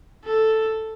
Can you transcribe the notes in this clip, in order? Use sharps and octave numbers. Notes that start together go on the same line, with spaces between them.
A4